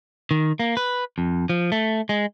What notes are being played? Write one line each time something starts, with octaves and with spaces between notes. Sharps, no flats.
D#3
A#3
B4
F2
F3
A3
G#3